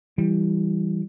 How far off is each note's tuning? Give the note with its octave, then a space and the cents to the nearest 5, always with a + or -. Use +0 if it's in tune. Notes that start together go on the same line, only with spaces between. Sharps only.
E3 +10 G3 +0